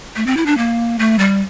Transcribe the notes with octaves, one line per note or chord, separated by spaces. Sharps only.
A3
C4
E4
D4
A#3
A3
G3